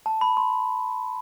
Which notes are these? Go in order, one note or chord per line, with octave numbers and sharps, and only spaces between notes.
A5
B5
C6